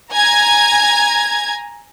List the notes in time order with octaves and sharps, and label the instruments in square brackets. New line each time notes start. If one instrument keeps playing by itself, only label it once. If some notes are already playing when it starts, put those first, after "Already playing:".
[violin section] G#5 A#5 G#6